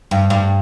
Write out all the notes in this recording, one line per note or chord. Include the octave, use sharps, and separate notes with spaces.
G2
G2